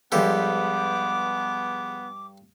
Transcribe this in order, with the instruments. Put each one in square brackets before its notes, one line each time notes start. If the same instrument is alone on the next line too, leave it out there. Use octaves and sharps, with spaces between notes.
[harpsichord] G2 G4 A4 [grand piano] F3 G#3 [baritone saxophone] B3 [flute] D6